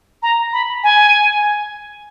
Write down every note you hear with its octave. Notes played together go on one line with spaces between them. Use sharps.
A#5
B5
G#5